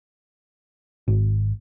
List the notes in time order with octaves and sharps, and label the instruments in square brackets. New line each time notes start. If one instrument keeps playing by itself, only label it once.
[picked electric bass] G#1